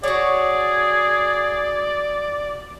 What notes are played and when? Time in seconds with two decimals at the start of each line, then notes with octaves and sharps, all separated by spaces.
0.03 F#4 G#4 C#5 D5